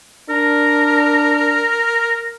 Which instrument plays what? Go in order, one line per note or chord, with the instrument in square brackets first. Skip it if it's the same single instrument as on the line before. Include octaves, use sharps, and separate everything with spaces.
[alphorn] D4 [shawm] A#4